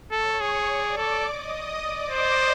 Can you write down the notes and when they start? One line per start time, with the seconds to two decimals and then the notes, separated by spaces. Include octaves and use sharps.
0.12 A4 C#5 C#6
0.40 G#4 C#5 C#6
0.68 D5 D6
0.97 A4 D5 D6
1.25 D#5 D#6
1.82 D5 D6
2.09 C5 D#5 D#6